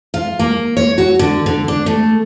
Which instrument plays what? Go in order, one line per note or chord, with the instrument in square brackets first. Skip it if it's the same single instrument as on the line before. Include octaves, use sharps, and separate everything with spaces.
[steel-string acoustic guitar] F4
A#3
C#5
F#4
D3
D3
D4
A3